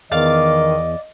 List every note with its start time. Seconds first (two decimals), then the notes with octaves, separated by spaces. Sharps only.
0.12 E2 D#3 D5 D#5 F5